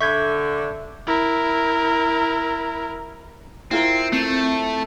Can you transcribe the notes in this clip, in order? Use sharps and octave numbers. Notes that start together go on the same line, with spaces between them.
D3 E5 C#6 G6 G#6
E4 A#4
C4 E4 F4 A#4
A3 C4 C#7